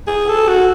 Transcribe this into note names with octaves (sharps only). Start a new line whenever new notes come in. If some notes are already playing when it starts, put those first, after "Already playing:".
G#4
A4
F#4